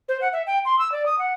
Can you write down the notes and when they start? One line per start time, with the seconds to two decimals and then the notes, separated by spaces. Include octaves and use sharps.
0.09 C5
0.21 F#5
0.33 E5
0.47 G5
0.65 C6
0.79 E6
0.92 D5
1.06 D#6
1.19 F#5